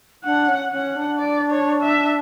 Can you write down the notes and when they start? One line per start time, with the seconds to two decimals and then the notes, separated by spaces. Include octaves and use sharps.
0.25 D4 F#5
0.48 C#4
0.72 C#4 F#5
0.96 D4
1.19 D5
1.51 C#5
1.82 E5